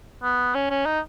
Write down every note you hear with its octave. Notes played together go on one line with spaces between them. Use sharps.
B3
C#4
C#4
D#4